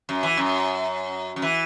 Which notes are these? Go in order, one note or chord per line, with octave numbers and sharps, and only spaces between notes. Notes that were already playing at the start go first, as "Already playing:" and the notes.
F#2
E3
F#2
F#2
E3